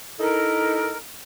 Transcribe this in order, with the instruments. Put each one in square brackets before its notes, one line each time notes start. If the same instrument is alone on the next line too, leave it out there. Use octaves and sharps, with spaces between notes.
[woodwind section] D#4 E4 A4 A#4